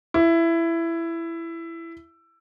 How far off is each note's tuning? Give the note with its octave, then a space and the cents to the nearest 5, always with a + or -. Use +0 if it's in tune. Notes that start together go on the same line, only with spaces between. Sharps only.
E4 +15